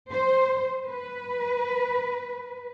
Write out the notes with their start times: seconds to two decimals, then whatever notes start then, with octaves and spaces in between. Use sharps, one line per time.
0.12 C5
0.88 B4